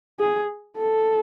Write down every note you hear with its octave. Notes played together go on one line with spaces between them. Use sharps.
G#4
A4